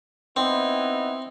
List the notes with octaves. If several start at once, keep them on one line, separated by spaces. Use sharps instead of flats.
B3 C4 D#4 E4